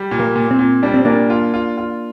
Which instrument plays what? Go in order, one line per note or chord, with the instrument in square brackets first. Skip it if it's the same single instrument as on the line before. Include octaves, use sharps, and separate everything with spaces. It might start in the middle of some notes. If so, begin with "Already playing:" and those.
Already playing: [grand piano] G3
A#2
[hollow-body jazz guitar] A#3
[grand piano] A#2
[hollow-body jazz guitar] C4
[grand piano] A#2
[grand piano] G3 [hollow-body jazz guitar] D4
[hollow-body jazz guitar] C4
[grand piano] A#2 [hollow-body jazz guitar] A#3 D4
[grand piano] F4
F4
F4